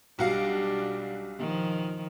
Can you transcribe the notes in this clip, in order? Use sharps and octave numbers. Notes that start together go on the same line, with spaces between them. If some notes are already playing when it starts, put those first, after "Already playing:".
B1 G3 D4 F#4 F5
D#3 F3